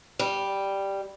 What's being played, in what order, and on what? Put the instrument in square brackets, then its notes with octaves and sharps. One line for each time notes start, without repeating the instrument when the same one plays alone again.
[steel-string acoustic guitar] G3